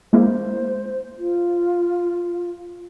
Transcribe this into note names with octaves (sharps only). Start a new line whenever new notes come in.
G#3 A#3 E4 C5
F4